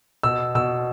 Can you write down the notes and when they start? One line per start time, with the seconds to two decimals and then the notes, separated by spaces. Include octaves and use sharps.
0.23 B2 E6
0.55 B2 E6